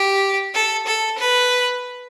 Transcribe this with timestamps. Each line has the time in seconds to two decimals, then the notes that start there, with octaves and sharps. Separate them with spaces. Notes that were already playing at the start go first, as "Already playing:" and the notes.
Already playing: G4
0.54 A4
0.86 A4
1.18 B4